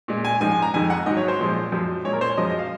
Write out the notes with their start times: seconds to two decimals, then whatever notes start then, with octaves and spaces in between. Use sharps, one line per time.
0.08 A#2 G#3
0.25 G#5
0.41 G#2 F3 G#3 G#5
0.51 G#5
0.62 A#5
0.74 F2 D#3 G#3 G#5
0.90 F#5
1.06 G#2 F#3 D#5
1.17 C#5
1.28 C5
1.39 A#2 F3 G#3
1.72 F#2 F3 G#3
2.04 A#2 G#3 C#5
2.13 A#4
2.21 C5
2.30 C#5
2.37 F#2 F3 G#3 D#5
2.50 D#5
2.59 F5